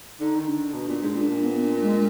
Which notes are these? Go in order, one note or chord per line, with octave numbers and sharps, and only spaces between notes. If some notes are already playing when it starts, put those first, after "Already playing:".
D3 D#4
D#3
D3 D4
B2
A#2
G#2 D4
A#2
D4
B3
D4
G#3